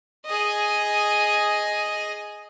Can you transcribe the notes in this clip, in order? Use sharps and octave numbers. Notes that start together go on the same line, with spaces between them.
G#4 D#5